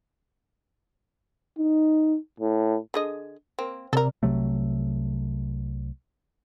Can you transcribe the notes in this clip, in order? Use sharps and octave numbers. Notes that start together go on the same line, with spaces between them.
D#4
A2
D3 G#4 D#5
A#3 C4
C3 A4 A#4 D5
C2 C3 F#3 A3